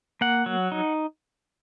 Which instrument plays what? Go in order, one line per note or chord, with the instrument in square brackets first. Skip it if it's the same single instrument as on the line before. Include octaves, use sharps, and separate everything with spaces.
[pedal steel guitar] A#3 F#5
F#3
D#4